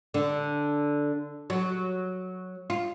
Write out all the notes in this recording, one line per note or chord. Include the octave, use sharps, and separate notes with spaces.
D3
F#3
F4